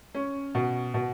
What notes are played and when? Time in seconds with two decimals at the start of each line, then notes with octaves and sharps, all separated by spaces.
0.14 C#4
0.55 B2
0.94 B2